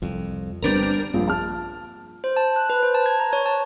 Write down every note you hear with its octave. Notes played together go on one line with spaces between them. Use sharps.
C2 F2
G1 G3 B3 C4 D4 A#4
A#1 G2 A#2
A5 F6
C5
A5
F#6
B4
C5
A5
G#6
A#5
C#5
A5